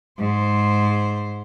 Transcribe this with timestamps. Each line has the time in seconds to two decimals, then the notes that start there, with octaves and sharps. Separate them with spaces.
0.19 G#2 C5